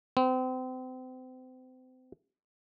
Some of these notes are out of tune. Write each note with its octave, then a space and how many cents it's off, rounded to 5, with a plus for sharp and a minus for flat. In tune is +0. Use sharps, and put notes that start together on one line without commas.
C4 -35